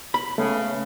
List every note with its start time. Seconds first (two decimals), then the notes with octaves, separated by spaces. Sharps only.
0.14 B5
0.38 C#3 A3 B3